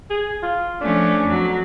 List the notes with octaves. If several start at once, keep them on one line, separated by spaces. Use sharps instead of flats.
G#4
F4
F3 A3 C#4 D4
F2 F#3